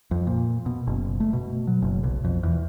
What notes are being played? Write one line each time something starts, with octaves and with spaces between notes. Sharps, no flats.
F2
A#2
B2
F#1
A3
B2
F#3
F#1
B1
F2
E2